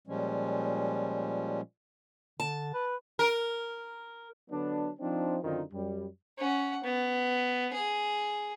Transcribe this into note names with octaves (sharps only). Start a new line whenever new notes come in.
A#2 F3 G3 G#3 C#4
D3 A5
B4
A#4
D3 F#3 B3 D4
F3 C4 D4 D#4
F#2 D3 D#3 C4 D#4 F4
F#2 G3
C#4 F#5
B3
G#4